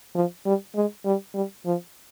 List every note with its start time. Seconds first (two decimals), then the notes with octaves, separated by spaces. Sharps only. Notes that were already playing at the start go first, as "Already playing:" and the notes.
0.15 F3
0.45 G3
0.75 G#3
1.05 G3
1.34 G3
1.66 F3